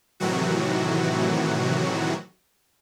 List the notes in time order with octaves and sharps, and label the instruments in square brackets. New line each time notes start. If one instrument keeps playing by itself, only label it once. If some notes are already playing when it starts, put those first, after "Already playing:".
[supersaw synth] A2 C3 D#3 E3 F#3 F#4